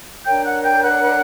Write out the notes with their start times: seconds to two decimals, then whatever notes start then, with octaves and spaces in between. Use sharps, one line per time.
0.24 D4 A#4 C#5 G5 G6
0.44 F#5 F#6
0.63 G5 G6
0.83 F#5 F#6